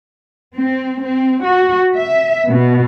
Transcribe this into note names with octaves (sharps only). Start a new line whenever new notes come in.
C4
C4
F#4
E5
B2